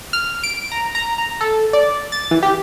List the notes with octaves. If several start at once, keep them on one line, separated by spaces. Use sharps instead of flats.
F6
D7
A#5
A#5
A#5
A4
D5
A6
E3
G4